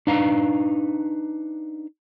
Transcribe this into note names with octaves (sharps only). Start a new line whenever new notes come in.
D4 D#4 B4 F5 A#5